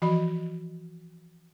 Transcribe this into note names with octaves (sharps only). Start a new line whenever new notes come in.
E3 F3 F#4 D#5 B5